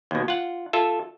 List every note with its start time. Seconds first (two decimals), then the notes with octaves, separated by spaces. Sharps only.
0.11 D#2 B2
0.28 F4 F#5
0.73 F4 A4 E5